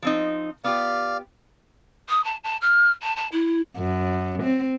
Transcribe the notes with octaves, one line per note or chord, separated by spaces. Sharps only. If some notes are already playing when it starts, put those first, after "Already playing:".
F3 C4 D#4
B3 F4 G4 D5 F5
D#6
A5
A5
F6
A5
A5
E4
F#2
C4